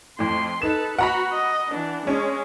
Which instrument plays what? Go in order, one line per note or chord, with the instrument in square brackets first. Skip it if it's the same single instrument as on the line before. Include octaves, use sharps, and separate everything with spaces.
[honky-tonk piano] F2 A2 [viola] C6
[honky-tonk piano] D#4 E7 [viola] A4 B4
[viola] F#4 [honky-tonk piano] F#5 A#5 B5
[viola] D#5
E3 D4
[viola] G#3 [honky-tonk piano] C#4